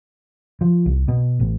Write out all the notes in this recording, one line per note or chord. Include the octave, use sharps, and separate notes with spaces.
F3
C2
B2
A1